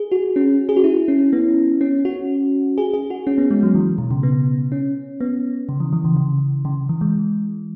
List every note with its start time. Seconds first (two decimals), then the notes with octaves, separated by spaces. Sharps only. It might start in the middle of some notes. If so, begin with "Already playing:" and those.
Already playing: G#4
0.12 F#4
0.36 C#4
0.69 G#4
0.76 F#4
0.84 E4
1.08 C#4
1.33 B3
1.81 C#4
2.05 F#4
2.78 G#4
2.94 G#4
3.10 F#4
3.27 C#4
3.38 B3
3.51 G#3
3.63 F#3
3.75 E3
3.98 B2
4.11 C#3
4.23 B3
4.72 C#4
5.21 B3
5.69 C#3
5.80 E3
5.93 E3
6.04 C#3
6.17 C#3
6.65 C#3
6.89 E3
7.01 G#3